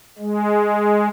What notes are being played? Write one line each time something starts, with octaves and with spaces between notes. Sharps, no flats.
G#3